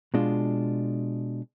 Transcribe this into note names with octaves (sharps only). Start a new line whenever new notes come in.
B2 G#3 D4 F4